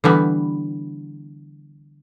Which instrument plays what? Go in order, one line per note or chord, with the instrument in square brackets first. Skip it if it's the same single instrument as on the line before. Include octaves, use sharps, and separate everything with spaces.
[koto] D3 E3 G3 B3